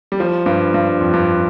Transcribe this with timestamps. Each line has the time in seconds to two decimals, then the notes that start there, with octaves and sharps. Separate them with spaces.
0.12 G3
0.20 F3
0.46 G2
0.74 G2
1.01 F2
1.13 G2